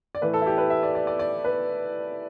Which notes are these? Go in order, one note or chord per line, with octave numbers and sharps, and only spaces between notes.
D5
A2 E3 A3 B4
A4
E4
G4
B4
E5
D5
D5
D5
D5
B4